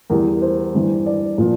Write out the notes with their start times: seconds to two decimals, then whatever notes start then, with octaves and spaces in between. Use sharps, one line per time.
0.10 E2 E3 G3 A#4
0.42 C5
0.74 G2 E3 G3
1.06 D5
1.38 A#2 F3